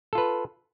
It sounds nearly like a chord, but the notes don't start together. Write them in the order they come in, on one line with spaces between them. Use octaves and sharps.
A4 F4 B4